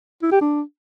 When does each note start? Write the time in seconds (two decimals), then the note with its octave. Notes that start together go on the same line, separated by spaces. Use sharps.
0.22 E4
0.32 G4
0.41 D4